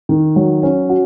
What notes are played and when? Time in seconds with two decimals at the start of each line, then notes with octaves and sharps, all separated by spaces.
0.09 D#3
0.36 F#3
0.63 C#4
0.89 F#4